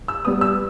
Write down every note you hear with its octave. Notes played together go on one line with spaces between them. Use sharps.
E6
G3 B3 D#6
E6